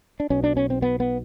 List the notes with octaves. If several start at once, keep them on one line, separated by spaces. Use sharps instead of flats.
D4
B1 B2 C#4
D4
C#4
C4
B3
B3